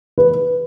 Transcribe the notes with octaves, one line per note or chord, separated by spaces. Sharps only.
B4